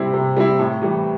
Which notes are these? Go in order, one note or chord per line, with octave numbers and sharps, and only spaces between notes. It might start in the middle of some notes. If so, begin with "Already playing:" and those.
Already playing: C3 G3 C4 E4
C3
G3 C4 E4
A2
E3 G3